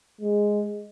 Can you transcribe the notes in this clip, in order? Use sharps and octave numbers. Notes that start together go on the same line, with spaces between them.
G#3